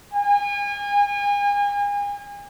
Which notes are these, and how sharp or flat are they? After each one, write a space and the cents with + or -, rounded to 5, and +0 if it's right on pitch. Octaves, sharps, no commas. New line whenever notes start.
G#5 -35